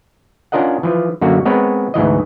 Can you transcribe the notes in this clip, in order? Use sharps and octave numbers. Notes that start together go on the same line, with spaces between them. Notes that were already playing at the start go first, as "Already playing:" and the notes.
C#4 D4 F4 A#4 D#5 F#5
E3 F3
F#2 D3 A#3 F#4
G#3 B3 C4 A#4 B4 C#5
D2 G#2 E3 D#5